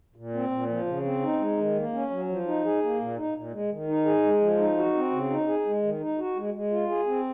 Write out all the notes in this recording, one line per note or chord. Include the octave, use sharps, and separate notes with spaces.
A#2
C4
A#2
F3
C#3
C4
D#4
G#3
D#3
A#3
C#4
F#3
F3
D#4
G#4
A#3
A#2
D#4
A#2
G#3
D#3
D#4
G#4
G#3
F3
D#4
F#4
C4
C#3
D#4
G#4
G#3
D#3
D#4
F#4
G#3
G#3
F4
G#4
C4